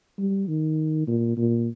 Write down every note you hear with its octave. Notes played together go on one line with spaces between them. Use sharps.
G3
D#3
A#2
A#2